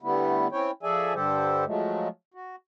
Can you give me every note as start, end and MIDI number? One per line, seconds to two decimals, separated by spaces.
0.02 0.47 50
0.02 0.47 55
0.02 0.47 57
0.02 0.47 59
0.02 0.47 64
0.52 0.71 60
0.52 0.71 61
0.52 0.71 64
0.52 0.71 73
0.52 0.71 79
0.83 1.14 53
0.83 1.14 68
0.83 1.14 69
0.83 1.14 74
0.83 1.14 76
0.83 1.14 80
1.14 1.64 43
1.14 1.64 50
1.14 1.64 55
1.14 1.64 67
1.14 1.64 69
1.14 1.64 72
1.65 2.08 53
1.65 2.08 54
1.65 2.08 56
1.65 2.08 57
2.34 2.56 66